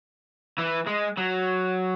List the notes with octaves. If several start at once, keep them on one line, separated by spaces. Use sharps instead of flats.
E3
G#3
F#3